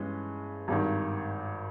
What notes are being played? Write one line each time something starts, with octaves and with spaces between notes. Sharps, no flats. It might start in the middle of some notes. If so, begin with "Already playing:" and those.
Already playing: G2 E3 G#3 C#4
G#1 G2 D#3